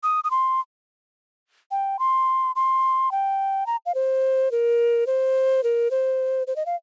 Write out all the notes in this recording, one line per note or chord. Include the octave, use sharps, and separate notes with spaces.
D#6
D#6
C6
G5
C6
C6
G5
A#5
F5
C5
A#4
C5
A#4
C5
C5
D#5
F5